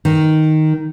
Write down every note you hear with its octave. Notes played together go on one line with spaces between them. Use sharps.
D#3